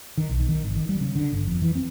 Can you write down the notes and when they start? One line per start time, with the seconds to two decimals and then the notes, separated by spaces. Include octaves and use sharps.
0.18 D#3
0.29 B1
0.49 D#3
0.63 G#1
0.76 D#3
0.89 G3
1.01 C#3
1.15 D3
1.32 G1
1.47 F2
1.62 E3
1.75 C4